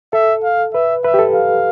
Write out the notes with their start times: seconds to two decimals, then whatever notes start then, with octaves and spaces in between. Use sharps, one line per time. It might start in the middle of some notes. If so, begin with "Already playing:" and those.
0.13 A4 E5
0.44 F5
0.74 B4 E5
1.04 B4 E5
1.14 G4
1.19 A4
1.34 F5